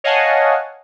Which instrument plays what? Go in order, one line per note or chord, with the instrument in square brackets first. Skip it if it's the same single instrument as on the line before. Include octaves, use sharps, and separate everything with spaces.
[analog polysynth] C#5 D#5 F5 F#5 G#5 A5